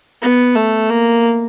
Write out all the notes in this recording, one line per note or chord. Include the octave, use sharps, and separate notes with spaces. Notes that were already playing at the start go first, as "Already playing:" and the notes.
B3
A3
A#3